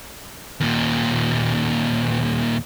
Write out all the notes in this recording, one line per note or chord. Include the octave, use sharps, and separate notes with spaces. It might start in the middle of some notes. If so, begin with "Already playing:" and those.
D#2 A#2